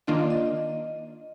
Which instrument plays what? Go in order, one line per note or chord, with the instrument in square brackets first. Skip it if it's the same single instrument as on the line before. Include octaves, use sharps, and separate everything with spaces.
[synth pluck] D#3 A#3 D4 F4 [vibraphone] D#5
[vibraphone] D5
D#5